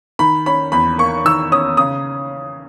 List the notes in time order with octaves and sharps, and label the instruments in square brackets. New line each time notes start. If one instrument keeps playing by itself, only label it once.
[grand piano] D#3 B5
C#4 B5
E2 B5
A#3 C#6
D#3 E6
C#4 D#6
C#3 D#6